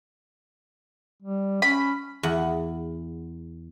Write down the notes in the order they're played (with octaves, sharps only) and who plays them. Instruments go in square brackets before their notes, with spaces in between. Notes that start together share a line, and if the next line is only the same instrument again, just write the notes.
[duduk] G3
[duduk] C#4 [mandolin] B5
[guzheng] E2 F#5